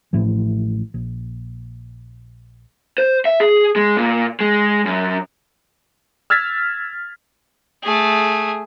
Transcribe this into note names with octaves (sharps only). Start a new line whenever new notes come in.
A1 A2 F3
A#1
C5
E5
G#4
G#3
A#2
G#3
F#2
E6 F6 G#6 A6 B6
A3 G#4